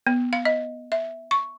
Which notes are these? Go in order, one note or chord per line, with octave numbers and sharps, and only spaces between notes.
B3
F5
D#5
E5
C#6